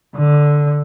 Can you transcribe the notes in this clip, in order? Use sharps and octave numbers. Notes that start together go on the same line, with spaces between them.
D3